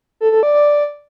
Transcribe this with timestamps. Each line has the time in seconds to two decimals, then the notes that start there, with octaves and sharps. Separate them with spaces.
0.21 A4
0.32 A4
0.43 D5
0.54 D5